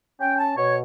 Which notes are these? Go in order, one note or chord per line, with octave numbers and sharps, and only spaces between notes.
C#4 G5
A5
B2 C#5